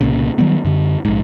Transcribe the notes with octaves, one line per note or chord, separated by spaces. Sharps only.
C2 A#2 C#3
D#3 F#3 G3 B3
F#2 D3
A#1 G#2